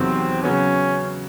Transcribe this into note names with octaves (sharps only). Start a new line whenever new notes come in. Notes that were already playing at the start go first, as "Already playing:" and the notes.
Already playing: E2 C3 D#3 F#3 C4
C#3 F#3 B3 C#4